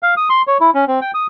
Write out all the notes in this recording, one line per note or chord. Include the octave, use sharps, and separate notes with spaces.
F5
D#6
C6
C#5
E4
C#4
C4
G5
D#6